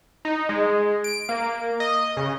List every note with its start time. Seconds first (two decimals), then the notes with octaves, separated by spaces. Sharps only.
0.25 D#4
0.49 G#3
1.04 D7
1.29 A#3
1.80 D#5
2.17 C#3